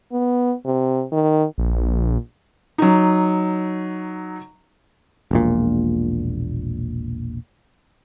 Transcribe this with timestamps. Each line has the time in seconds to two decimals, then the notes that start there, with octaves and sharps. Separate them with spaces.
0.12 B3
0.66 C3
1.12 D#3
1.58 A#1
2.78 F#3 D#4
5.31 E1 A#1 A#2